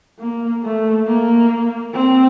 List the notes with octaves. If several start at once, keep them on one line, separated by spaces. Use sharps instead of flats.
A#3
A3
A#3
C4